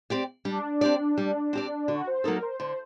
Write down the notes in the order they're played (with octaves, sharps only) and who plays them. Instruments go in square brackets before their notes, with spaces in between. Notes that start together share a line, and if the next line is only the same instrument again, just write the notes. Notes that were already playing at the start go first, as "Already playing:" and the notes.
[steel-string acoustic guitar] C4 G4 D5
[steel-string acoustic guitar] G3 [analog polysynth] D4
[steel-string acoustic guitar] C4 G4 D5
G3
C4 G4 D5
[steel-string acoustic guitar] D3 [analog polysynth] F#4
[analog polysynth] C5
[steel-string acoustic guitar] F#3 A#3 D#4 A4 [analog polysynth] A#4
[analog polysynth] C5
[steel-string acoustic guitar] D3 [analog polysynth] C5